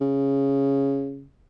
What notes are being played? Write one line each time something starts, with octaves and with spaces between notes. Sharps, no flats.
C#3